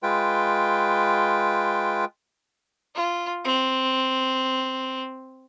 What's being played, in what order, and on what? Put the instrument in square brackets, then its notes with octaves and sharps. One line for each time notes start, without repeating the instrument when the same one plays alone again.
[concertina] G#3 F4 B4 G5
[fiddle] F4
C4